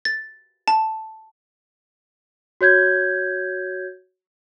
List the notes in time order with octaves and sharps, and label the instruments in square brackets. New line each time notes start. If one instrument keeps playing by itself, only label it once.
[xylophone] A6
A5
[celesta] F#4 C#5 G6 G#6